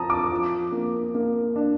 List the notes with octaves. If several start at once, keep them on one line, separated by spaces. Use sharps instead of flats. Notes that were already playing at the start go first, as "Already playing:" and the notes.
Already playing: F3 C4 A5 A#5 D#6
D6
F3
A#3
A#3
D4